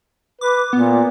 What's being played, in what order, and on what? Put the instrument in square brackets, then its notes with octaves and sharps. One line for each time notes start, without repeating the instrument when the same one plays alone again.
[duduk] B4 [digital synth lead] D6
[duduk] A#2 [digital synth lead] B3